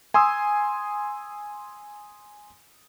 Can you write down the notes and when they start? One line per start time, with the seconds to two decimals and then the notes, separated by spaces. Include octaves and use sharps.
0.14 G#5 C6 D#6 E6